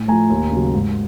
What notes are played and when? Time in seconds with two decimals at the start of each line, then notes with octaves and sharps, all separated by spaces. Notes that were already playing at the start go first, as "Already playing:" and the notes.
Already playing: A2
0.08 F3 A3 G#5 A#5
0.30 D#2
0.51 C#3 F#3
0.74 G#2